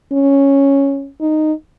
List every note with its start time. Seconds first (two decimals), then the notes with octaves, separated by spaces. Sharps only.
0.12 C#4
1.20 D#4